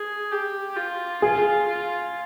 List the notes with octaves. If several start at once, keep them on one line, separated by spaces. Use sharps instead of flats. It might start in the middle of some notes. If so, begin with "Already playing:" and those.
Already playing: G#4
G4
F4
F4 G#4
F4